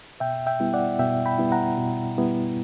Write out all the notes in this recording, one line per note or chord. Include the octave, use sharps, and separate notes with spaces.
B2 E5 G5
E5 G5
G3 B3 E4
D5 F#5
B2 E5 G5
G5 B5
G3 B3 E4
F#5 A#5
B2
G3 B3 E4